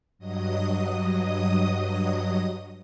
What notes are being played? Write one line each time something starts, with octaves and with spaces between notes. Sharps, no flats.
G2 F#3 D#5 D#6